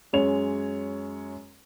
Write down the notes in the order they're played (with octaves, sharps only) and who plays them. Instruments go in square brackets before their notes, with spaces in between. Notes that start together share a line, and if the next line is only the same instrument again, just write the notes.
[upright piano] F#2 G#3 C#5 F7